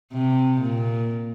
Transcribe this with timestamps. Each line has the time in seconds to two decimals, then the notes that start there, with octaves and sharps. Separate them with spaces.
0.12 C3
0.60 A#2